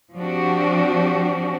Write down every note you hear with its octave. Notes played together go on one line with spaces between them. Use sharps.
F3 C4 D4 F#4 G4